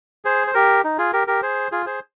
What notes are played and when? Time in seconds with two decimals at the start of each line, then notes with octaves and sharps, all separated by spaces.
0.25 G#4 C5
0.47 C5
0.54 G4 A#4
0.84 D#4
0.98 F4 G#4
1.13 G4 A#4
1.27 G4 A#4
1.42 G#4 C5
1.72 F4 G#4
1.86 G#4 C5